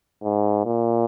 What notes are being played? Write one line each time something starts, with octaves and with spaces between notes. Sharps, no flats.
G#2
A#2